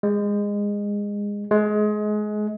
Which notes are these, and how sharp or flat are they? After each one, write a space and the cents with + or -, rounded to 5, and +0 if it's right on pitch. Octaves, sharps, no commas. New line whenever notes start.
G#3 -20
G#3 +25